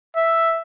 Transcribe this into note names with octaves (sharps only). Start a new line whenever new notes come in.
E5